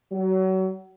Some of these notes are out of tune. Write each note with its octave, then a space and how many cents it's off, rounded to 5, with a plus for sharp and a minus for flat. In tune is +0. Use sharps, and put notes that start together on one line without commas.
F#3 +30